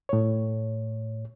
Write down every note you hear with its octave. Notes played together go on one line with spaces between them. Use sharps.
A2 C#5